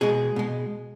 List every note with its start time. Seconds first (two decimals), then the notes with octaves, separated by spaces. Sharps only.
0.01 B2 G#3 G#4
0.36 B2 G#3